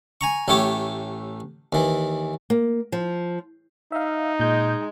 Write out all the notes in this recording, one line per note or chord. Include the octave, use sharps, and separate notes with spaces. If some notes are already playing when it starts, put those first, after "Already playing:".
G#5 A#5 C#6
A1 A2 A3 G4 C#5 D6
D#2 E3
A#3
F3
D#4 E5 F5
A#2 G#3 G6